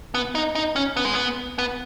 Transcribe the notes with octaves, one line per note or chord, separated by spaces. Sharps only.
B3
D#4
D#4
C#4
B3
G#3
B3
B3